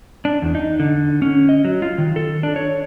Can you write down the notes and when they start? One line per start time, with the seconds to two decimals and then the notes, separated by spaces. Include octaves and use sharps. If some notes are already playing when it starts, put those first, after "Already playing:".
0.25 D4
0.42 E2
0.55 D#4
0.80 D3
1.22 C#4
1.49 D#5
1.65 F#3
1.82 F4
1.98 D#3
2.16 A4
2.43 D4
2.56 C#5